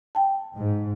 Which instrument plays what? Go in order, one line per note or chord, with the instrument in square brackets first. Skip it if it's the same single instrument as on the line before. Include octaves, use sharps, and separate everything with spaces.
[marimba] G5 A5
[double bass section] G#2